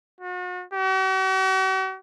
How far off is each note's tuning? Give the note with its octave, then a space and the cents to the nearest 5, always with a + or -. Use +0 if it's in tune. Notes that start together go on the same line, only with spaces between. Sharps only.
F#4 -40
F#4 +45